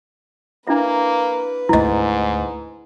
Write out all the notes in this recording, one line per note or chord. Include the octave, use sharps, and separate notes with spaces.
A#3 D4 E4 B4 E5
G#1 D2 G#2 E4 D#5